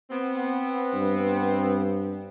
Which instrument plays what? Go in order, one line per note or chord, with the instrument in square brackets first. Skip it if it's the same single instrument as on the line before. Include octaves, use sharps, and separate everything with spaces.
[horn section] B3 C4
[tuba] G2